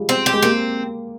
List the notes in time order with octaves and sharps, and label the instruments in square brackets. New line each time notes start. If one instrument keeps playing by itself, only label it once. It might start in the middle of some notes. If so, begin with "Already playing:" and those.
Already playing: [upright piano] F3 G3 G#3
[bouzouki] C4
G4
[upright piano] G#3
[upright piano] A#3 [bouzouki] C4